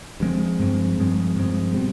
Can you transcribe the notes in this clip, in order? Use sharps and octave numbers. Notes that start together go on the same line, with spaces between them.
G2 F3 G#3 C4
G2 F3 G#3 C4
G2 F3 G#3 C4
G2 F3 G#3 C4
B2 G3 C4